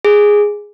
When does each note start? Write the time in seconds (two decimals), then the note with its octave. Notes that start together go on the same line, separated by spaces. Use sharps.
0.05 G#4